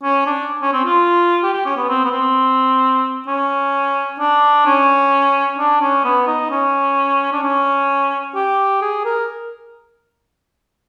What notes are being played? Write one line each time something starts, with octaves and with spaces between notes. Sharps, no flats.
C#4
D4
C#4
C4
F4
G4
G4
C#4
B3
C4
B3
C4
C#4
D4
C#4
D4
C#4
B3
D#4
C#4
D4
C#4
G4
G#4
A#4